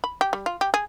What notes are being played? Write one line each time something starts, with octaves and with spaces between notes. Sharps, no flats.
B5
G4
G3
F4
G4
G#4